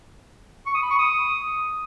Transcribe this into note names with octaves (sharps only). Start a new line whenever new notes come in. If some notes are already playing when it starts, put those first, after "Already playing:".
C#6
D#6
B5
C#6
D#6